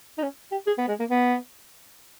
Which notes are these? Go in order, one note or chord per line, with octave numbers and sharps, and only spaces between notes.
D#4
C#4
G4
G#4
B3
G#3
A#3
B3